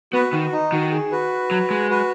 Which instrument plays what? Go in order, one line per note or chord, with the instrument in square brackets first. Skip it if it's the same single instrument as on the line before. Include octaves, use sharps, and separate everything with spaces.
[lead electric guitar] B3 [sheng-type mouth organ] F#4 B4
[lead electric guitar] D#3 [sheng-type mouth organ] F#4
[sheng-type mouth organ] D#4
[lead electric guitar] D#3 [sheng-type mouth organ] F#4
[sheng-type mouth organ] G#4
F#4 B4
[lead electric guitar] F#3
G#3
[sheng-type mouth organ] F#4 B4